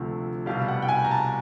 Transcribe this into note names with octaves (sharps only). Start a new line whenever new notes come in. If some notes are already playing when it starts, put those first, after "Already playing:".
Already playing: D2 C3 F3 A3
C2 B2 G3 F5
F#5
G5
G#5
A#5
A5